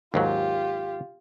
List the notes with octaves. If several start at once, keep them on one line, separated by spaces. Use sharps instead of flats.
D#2 G#2 F#3 F4 G4